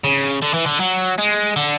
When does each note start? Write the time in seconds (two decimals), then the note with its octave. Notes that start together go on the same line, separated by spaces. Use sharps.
0.04 C#3
0.42 D3
0.54 E3
0.66 D3
0.80 F#3
1.19 G#3
1.56 D3